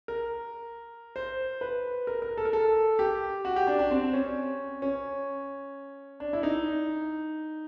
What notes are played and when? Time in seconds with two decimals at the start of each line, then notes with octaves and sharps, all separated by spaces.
0.08 A#4
1.16 C5
1.61 B4
2.07 A#4
2.22 A#4
2.37 A4
2.45 A#4
2.53 A4
2.99 G4
3.45 F#4
3.56 G4
3.67 D4
3.79 D4
3.91 C4
4.13 C#4
4.82 C#4
6.20 D4
6.33 E4
6.43 D#4